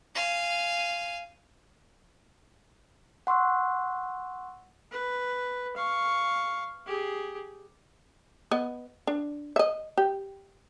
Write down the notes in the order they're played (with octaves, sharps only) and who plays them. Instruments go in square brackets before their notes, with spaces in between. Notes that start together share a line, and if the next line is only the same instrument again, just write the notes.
[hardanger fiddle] F5 G#5
[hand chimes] F#5 C6 C#6 E6 F#6
[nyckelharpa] B4
F5 C#6
G4 G#4
[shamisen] B3 D#5
D4
D#5 E5
G4